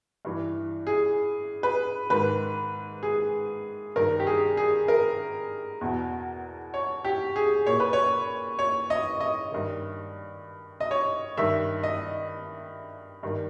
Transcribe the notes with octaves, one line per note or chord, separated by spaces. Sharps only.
G2 E3
G#4
B4
G#2 D#3 B4
G#4
G2 D#3 A#4
G4
G#4
G#4
A#4
E2 B2
C#5
G4
G#4
A#2 C#5
B4
C#5
C#5
D#5
D#5
G2 D#3
D#5
C#5
G2 D#3 E5
D#5
G2 D#3